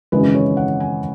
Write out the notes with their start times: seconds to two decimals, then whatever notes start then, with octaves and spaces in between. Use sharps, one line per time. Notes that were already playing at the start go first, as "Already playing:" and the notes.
0.12 G#1 F#2 C#3 E3 G#3 B4
0.35 C#5
0.57 F#5
0.80 G#5